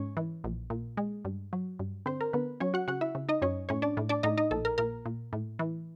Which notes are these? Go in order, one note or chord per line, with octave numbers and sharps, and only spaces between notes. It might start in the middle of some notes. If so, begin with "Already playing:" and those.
Already playing: G#2 C#4 C#5
E3
A#1
A#2
G#3
G2
F#3
G2
D3 C4 C5
A#4
D3 B3 B4
F#3 C#4 C#5
F#4 F#5
C#3 F#4 F#5
E4 E5
C#3
D#4 D#5
F#2 C#4 C#5
A2 C#4 C#5
D4 D5
A2
D4 D5
A2 D#4 D#5
D#4 D#5
A#1 A4
A#4
A#2 A#4
A#2
A2
E3